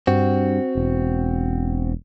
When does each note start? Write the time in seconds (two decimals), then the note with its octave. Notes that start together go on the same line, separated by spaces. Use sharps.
0.07 G2 C4 F#4
0.75 E1